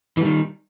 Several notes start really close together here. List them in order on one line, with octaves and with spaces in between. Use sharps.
E3 G3 D#3